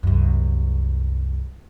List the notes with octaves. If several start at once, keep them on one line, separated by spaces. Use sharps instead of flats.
C2 F#2